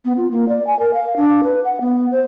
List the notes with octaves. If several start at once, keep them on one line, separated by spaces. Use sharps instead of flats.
B3
F4
A#3
D5
G#5
A#4
F5
D4
B4
F#5
B3
C5